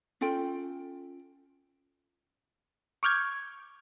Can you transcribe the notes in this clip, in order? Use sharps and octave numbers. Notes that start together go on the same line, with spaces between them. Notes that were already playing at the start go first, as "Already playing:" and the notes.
C#4 F4 A4 G5
C#6 D6 F6 G6 G#6